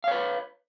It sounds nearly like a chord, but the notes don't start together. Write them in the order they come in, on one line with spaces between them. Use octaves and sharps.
F5 C#5 B4